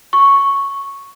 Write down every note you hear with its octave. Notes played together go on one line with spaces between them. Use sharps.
C#6